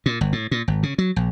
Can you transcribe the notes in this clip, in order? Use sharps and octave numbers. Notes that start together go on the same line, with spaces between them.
A#2
G1
A2
A#2
G#1
C#3
F#3
A#1